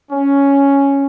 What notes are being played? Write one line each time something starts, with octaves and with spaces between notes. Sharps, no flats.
C#4